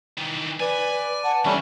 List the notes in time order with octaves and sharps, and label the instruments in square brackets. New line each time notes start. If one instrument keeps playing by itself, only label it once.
[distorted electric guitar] D#3 E3
[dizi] B4 [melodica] D5 [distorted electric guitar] G#5
[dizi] F#5 [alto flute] A5
[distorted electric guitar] E3 D4 [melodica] G3 A3 C#4 [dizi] C#6